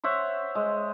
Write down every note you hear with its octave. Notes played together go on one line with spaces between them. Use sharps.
C5 C#5 E5 F#5
G#3